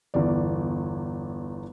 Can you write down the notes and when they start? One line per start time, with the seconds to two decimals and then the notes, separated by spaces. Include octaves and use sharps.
0.14 G1 E2 D5